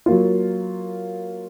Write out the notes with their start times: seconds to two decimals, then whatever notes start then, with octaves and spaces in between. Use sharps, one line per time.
0.06 F#3 A#3 F4